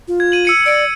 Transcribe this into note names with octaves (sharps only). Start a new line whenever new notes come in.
F4
G#6
D#7 F#7
E6 C#7 D#7
D5 E6 D7